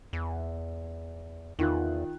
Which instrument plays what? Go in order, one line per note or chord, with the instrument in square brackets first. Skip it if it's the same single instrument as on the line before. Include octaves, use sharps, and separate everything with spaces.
[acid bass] E2
[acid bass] E2 [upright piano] D#3 F4 F#6